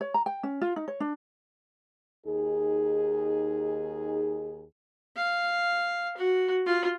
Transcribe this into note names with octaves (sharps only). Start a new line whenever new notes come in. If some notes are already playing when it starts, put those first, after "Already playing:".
C#5
A#5
G5
C#4
F4
D#4
C#5
D4
D#2 D#4 G#4
F5
F#4
F4